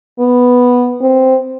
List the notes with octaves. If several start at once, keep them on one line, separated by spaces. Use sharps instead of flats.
B3
C4